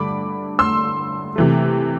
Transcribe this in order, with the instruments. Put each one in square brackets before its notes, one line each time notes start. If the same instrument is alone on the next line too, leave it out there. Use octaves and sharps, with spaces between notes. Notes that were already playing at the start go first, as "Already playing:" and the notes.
Already playing: [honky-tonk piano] G2 D3 A3 B5 D6
C6 E6
C3 E3 A3